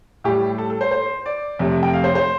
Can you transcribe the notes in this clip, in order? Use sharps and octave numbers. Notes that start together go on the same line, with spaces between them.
A2 G3 G4
A4
A4
C5
C5
D5
F2 C3 A3
G5
F5
C5
C5